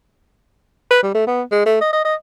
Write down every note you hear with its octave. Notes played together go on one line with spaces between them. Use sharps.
B4
G3
A3
B3
G#3
A3
D#5
D#5
D#5